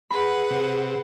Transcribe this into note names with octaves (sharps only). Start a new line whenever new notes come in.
G#4 B4 F#5 B5
C3